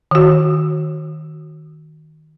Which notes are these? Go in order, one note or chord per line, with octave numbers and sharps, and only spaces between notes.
D#3 F#4